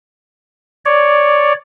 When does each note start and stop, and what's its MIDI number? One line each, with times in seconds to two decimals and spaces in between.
0.85 1.53 73
0.85 1.53 74